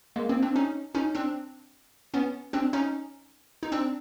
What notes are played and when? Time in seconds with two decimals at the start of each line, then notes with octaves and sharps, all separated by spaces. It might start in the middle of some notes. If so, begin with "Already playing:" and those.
0.16 G#3 A#3
0.29 A#3 C4
0.42 C4 D4
0.56 C#4 D#4
0.95 C#4 D#4
1.15 C4 D4
2.14 B3 C#4
2.53 C4 D4
2.73 C#4 D#4
3.63 D#4
3.72 C4 D4